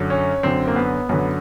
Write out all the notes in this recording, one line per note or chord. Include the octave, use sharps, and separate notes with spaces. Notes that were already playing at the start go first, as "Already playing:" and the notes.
Already playing: F#2 D3
C#4
F#2 D3 C4
A#3
B3
F#2 D3 B3